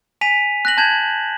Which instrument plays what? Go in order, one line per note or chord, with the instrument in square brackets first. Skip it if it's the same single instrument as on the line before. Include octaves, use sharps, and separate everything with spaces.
[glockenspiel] G#5 B6 D#7 F7
F#6 A#6 F#7
A5 G6 G#6 E7 F#7